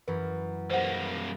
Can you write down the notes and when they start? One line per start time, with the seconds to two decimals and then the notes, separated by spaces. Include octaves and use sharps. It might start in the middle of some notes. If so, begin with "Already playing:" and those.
0.08 F#2 E3 B4
0.70 G3 A#3 C5 F#5